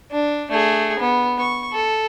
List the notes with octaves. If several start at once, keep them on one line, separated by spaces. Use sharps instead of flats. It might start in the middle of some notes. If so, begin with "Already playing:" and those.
D4
A3 G#4
B3
C#6
A4